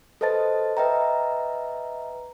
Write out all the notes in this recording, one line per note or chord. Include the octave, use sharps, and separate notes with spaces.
A4 B4 C5 D#5 A5 A6
B4 D#5 E5 G5 A#5